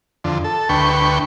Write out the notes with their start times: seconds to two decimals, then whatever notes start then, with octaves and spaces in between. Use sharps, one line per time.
0.24 F2 D3
0.44 A4
0.69 D2 B4 G5 C#6